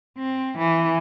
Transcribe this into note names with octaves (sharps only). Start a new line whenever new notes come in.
C4
E3